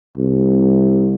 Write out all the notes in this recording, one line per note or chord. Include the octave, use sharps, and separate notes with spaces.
C2